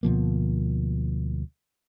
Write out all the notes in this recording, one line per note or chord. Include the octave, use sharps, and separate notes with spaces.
D2 B2 F3 A#3